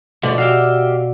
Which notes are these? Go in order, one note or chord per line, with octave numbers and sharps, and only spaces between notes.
B2 D3 F3 A3 D5
F#4 G4 E5 F5